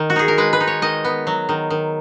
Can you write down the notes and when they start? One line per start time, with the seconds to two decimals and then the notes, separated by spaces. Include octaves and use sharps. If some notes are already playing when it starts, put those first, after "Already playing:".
Already playing: D#3
0.10 F#4
0.16 D#4 G#4
0.28 A#4
0.38 G#3 B4
0.53 B4
0.60 D#4
0.67 C#5
0.82 D#3 D#5
1.05 B3
1.27 F#3
1.49 D#3
1.70 D#3